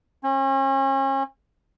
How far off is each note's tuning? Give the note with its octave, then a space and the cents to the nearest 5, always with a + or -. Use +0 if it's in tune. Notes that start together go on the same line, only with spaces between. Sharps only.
C#4 -40